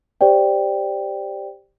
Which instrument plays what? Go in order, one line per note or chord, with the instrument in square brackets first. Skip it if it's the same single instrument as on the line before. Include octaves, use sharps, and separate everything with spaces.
[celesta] G4 C5 D5 G5